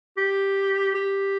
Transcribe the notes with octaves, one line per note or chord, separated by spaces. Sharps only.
G4
G4